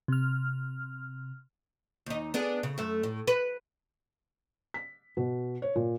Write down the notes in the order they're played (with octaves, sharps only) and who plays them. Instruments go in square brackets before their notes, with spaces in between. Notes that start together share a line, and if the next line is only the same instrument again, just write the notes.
[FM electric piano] C3 F6
[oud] D#2 D#4
B3 D4 G#4
C#3
F#2 A3
A2
B4
[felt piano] B6
B2
C#5
A#2